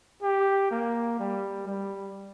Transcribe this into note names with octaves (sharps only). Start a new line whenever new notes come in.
G4
A#3
G3
G3